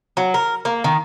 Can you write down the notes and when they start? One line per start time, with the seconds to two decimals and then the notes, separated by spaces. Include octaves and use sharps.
0.17 F#3
0.34 A#4
0.65 A#3
0.84 D#3